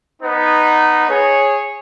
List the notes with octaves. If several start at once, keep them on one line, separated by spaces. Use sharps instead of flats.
B3 D#4
G#4 C#5